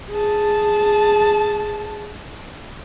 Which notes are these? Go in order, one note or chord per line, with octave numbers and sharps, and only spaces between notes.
G#4 A5